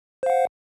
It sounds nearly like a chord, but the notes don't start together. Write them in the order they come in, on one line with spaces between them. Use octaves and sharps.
C5 F5 F#5